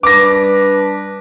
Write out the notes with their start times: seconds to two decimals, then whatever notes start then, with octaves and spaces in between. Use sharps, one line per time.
0.03 G3 D4 B4 D6 A#6